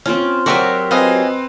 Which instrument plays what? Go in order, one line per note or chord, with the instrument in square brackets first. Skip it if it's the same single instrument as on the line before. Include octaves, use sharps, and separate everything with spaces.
[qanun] C4 F4 F5 [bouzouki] C#4
[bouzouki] F#3 G4 A#4 [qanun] C5 E5 F#5 [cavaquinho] D5 C#6
[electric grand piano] C4 B4 [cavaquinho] F4 D#5 G#5